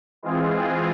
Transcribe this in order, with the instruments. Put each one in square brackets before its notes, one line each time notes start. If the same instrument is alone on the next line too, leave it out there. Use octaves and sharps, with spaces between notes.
[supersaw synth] E3 G#3 C4 F4 G#4